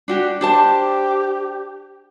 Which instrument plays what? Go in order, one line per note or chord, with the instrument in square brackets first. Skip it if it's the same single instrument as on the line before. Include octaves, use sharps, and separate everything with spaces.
[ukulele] D4 F#4 G4
[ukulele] D4 C5 A5 [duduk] G4